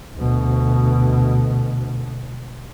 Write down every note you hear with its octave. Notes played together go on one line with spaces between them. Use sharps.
D2 B2